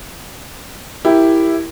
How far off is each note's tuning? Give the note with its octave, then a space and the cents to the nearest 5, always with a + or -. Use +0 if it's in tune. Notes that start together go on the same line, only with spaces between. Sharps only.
E4 +0 G4 +0 A#4 +0